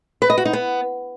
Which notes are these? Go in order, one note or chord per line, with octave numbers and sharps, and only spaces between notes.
B4
D#5
F#4
D#4
B3